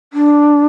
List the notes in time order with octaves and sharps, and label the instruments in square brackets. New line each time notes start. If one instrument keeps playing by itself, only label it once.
[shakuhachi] D4